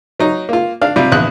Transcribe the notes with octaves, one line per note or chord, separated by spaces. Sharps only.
F#3 D#4
A#3 F4
D4 F5
C3 G3 F4
A#1 E2 F#6